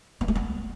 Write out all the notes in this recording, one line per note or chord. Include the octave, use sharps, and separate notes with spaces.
B3
A3
B3